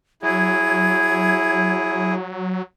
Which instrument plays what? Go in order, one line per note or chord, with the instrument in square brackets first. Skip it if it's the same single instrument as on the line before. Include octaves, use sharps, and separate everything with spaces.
[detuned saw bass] F#3 [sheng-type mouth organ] E4 G#4 [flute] G#6